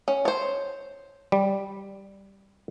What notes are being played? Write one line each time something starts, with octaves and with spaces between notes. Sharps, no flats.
C#4
C5 C#5
G3